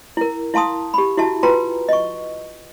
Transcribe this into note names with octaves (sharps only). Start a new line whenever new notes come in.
E4 A#4
E4 F5 A5 C6 D#6
G4 B5
E4 F#4 E5 A5
F4 B4 G5 A#5 C6
D#5 C#6